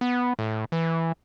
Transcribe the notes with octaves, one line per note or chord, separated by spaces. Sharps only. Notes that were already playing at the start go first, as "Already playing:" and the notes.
B3
A2
E3